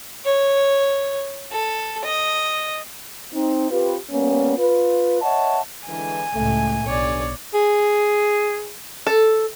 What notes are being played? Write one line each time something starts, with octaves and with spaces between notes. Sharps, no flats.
C#5
A4
D#5
C4 D#4
C4 F4 G4 B4
G3 A#3 B3 C#4
F4 B4
C#5 D#5 E5 F#5 A5
D3 E3 G#3 G#5
C#2 A2 A3
B1 G2 D3 C#5 D5
G#4
A4